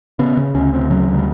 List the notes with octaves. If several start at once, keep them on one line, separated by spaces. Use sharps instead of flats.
C#3 B3
C#3
D2 C#4
D2 C4
C#3 F#3
D2
G3